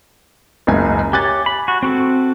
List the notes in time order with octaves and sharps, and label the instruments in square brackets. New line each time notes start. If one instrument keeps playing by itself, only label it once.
[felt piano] F#1 C#2 G#5
[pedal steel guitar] G4 C#5 [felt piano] G#5 F#6 A6
[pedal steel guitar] B5
F#4
C4 F#4 A4